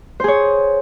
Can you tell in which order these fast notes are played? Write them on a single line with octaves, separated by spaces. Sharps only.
C5 G#4 C#5